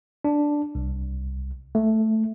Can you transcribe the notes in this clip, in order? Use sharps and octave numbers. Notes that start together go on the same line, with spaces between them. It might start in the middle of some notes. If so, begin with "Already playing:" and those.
D4
C2
A3